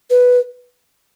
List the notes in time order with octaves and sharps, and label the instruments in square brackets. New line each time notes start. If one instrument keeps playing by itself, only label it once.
[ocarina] B4